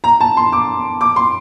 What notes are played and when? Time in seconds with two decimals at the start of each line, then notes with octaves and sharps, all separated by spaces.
0.04 A#5
0.20 A5
0.37 C6
0.53 D6
1.01 D6
1.16 C6